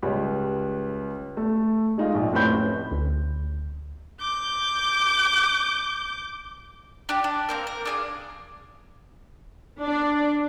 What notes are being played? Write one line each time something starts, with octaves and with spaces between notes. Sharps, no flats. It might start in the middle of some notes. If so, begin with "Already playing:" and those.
C#2 G3 C#4
A3
G#3 D#4 F4
A#1
F1 A2 C4 C#4 B5 G6
D2
D6 G6
D4 G4
D4
A#3 C4 A#4
A#4
D4 G#4 F5
D4 D5